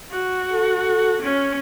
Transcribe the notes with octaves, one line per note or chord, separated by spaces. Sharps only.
F#4
A4
C#4